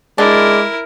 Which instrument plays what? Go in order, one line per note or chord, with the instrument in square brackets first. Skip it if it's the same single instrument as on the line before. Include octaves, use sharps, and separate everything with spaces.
[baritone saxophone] G#3 [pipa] D4 [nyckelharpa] E4 A#4